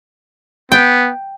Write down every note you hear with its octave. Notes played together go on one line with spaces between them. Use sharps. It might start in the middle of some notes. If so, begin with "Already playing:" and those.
B3 G5